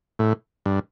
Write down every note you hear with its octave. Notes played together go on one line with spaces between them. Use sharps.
A2
G2